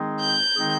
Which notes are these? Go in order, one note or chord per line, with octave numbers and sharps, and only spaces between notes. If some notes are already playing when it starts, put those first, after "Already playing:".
Already playing: D#3 G#3 C4 D#4 G#4
G6
D#3 G#3 C4 D#4 G#4